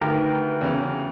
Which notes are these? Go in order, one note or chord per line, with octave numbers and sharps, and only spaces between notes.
D2 D#3 G4 A#4 B4
E2 C#3